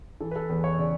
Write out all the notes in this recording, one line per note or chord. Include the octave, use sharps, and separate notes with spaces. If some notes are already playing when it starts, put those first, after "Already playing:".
E3 A4
B4
A4
E2 B4
C#5
C#3 D5